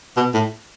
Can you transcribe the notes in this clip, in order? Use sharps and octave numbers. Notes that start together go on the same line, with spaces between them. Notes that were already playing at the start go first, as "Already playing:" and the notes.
B2
A2